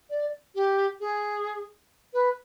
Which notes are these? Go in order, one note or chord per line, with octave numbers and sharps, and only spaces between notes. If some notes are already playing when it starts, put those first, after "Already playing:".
D5
G4
G#4
B4